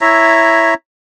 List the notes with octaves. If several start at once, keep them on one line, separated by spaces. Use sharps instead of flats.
E4 C#5 E5 A#5